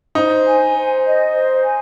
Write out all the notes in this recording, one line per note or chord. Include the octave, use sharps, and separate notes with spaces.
D#4 C5
G#5
C5
D#5
C5
G#5